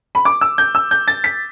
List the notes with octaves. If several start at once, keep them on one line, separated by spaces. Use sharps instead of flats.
B5
D6
E6
G6
E6
G6
A6
B6